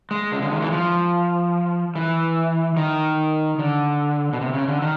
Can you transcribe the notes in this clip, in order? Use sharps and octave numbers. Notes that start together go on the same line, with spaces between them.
G#3
C#3
D3
D#3
E3
F3
E3
D#3
D3
B2
C3
C#3
D3
D#3